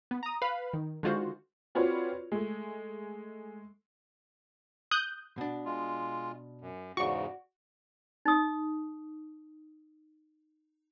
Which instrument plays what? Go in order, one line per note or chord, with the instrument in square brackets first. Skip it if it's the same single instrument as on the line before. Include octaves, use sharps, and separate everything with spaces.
[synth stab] B3
A#5 D#6
B4 F5 B5
D#3
D3 D#3 G#3 F4 F#4 C5
[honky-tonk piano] C4 F4 F#4 B4 C#5 D5
G#3 A3
[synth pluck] D#6 F#6 G6
[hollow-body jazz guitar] B2 D4
[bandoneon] G#3 F4
F#2
[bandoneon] E2 G#2 C#3 [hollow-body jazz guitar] F#4 D5 [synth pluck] C#6
[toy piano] D#4 D#6